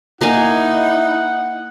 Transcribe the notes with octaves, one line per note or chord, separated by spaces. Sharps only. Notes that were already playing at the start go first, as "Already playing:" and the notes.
A#3 D#4 E4 F5 F#5 G#5